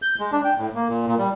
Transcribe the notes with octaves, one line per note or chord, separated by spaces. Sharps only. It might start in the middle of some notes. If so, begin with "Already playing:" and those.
G6
G#3
D4
G5
A2
A#3
A#2
A#2
G3